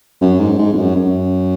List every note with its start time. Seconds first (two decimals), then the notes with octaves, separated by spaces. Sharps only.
0.21 F#2
0.40 G#2
0.58 G#2
0.73 F2
0.77 F#2
0.96 F#2